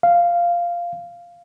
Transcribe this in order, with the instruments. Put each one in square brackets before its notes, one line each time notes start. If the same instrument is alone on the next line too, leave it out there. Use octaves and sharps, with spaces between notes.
[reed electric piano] F5